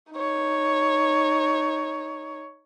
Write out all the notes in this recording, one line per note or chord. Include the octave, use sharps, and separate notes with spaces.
D#4 C#5